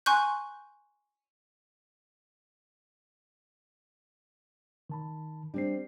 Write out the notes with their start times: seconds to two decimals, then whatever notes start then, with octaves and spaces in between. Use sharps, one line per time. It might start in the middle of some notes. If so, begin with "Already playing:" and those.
0.06 G#5 C6 C#6 F#6 G6
4.90 D#3 A5 B5
5.54 G3 C4 D4 C7